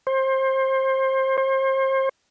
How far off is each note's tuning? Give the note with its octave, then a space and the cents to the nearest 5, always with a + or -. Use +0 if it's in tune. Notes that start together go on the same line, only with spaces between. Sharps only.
C5 +25
C5 +35